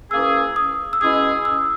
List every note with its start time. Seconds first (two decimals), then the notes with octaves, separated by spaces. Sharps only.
0.11 E3 A#3 C#4 G#4 E6
0.56 D#6
0.93 E6
1.01 B2 G#3 C#4 E4 G#4 D#6
1.45 E6